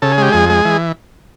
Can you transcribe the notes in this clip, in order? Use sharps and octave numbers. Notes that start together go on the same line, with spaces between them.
C#3 A4
G#4
G#3 G4
F2 G#4
G#3
E3